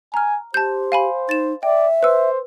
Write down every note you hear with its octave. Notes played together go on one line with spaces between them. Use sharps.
G#5 A#5 F6
G4 C5 A5 G6
F5 G#5 B5
D#4 A6 E7
D5 E5 G5
B4 C5 E6